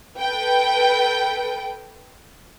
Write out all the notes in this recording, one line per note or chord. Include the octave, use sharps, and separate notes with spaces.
A4 B4 G5